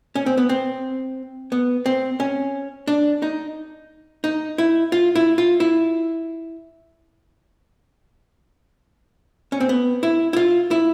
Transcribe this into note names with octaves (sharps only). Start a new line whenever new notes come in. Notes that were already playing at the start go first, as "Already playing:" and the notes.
C#4
C4
B3
C4
B3
C4
C#4
D4
D#4
D#4
E4
F4
E4
F4
E4
C#4
C4
B3
E4
E4
F4
E4